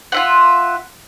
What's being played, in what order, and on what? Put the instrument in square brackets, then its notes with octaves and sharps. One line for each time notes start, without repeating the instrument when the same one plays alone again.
[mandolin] F4 E5 F#5